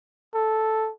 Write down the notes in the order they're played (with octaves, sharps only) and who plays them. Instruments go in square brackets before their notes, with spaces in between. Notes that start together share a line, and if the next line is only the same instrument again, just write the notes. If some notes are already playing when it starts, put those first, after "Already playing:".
[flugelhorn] A4